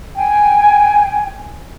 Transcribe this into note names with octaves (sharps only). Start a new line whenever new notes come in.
G5 G#5